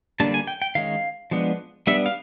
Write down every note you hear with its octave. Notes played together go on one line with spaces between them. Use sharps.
D3 G3 A#3 D4 A5
G#5
G5
G5
D#3 G#3 C#4 F5
F3 G#3 B3 D4
G3 B3 D4 E5
F5